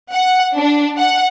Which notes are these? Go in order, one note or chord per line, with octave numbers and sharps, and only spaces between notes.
F#5
D4
F#5